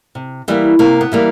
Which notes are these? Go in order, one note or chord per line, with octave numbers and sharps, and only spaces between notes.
C3
E3 G3 A#3
C3 A#3
B3
E3 G3 A#3